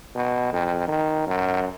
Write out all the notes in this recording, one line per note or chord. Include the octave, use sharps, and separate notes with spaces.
B2
F2
D#3
F#2